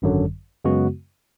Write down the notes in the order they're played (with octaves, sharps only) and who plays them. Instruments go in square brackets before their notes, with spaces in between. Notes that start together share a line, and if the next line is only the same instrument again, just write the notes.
[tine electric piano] G#1 F#2 D3 F#3
F#2 C#3 G#3 B3 F#4